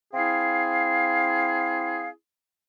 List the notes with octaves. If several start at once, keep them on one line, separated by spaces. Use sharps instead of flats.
C4 E4 G#4 F5